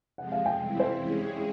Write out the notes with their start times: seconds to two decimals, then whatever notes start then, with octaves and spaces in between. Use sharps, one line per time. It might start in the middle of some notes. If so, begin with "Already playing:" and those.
0.18 C3 F3 G#3 F#5
0.32 F5
0.46 G5
0.60 E3 G3 C4 E4
0.80 C5
1.00 G#3 C#4 E4 G#4